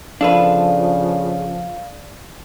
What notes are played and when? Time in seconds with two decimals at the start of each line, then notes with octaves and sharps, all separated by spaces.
0.21 C#3 F3 D4 A4 B4 F5